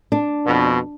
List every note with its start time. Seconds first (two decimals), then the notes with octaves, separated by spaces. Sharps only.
0.12 D4
0.47 F2 B2